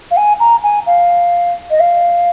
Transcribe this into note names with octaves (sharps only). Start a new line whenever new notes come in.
F5
G#5
A#5
G#5
F5
D#5
F5